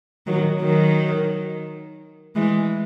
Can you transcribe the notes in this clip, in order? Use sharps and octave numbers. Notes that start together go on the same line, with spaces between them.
D#3 F#3
D#3 F#3
E3 G#3